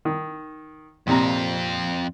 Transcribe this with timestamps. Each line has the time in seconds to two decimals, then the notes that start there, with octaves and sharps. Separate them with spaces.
0.05 D#3
1.07 A#1 F2 C3 C4 A#5